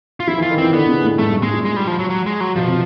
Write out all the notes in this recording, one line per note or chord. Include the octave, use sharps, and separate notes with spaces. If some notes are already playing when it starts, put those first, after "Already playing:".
F4
F3 E4
E3 F4
D#3
E3 C4
D3 B3
C#3
A2
G#2 A3
G2
G#2 G#3
A#2
G#3
G3
F3
F#3
F#3
G#3
F#3
B2 F3
C3